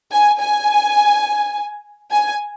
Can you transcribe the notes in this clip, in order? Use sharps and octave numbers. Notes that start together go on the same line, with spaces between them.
G#5
G#5
G#5